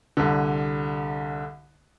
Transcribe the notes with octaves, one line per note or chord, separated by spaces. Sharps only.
C2 D3